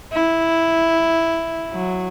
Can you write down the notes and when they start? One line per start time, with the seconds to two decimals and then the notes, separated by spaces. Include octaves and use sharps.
0.12 E4
1.72 F#3